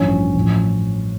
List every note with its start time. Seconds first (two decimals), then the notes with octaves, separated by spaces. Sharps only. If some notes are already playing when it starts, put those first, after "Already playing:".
Already playing: A1 G2 F3 C#4 C#5
0.35 A1 A2 F3